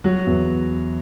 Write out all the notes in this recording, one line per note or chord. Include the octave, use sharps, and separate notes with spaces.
F#3 F#4
E2